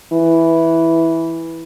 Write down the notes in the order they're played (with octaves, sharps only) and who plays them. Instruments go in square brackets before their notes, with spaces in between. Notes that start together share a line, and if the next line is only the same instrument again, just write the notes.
[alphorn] E3